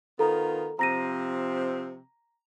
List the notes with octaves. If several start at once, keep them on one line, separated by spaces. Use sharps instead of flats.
D#3 B3 F4 A4 A#5
C3 F3 C4 A#5 A#6 D#7